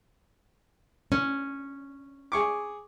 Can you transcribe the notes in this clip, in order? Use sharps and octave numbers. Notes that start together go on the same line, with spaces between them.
C#4
G#4 C#6 D6